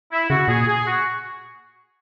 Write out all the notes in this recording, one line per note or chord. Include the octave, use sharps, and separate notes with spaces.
E4
C#3 F#4
A#2 G#4
G#4
F#4